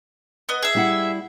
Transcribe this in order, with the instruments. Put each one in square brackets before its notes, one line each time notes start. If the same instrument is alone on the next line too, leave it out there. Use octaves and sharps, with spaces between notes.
[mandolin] B3 D#5
G#4 E5
[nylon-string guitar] G3 E4 F#5